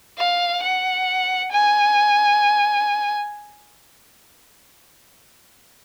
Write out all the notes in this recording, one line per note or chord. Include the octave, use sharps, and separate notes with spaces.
F5
F#5
G#5